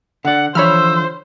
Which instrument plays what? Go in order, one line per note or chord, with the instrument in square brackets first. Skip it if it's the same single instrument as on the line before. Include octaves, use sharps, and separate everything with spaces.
[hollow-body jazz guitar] D3 D5 [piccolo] F#5
[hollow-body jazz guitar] D3 E3 F3 [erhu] C5 [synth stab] C#5 B5 F6 [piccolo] E6